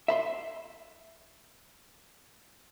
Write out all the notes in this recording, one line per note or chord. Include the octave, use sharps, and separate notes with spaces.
E5 B5 C6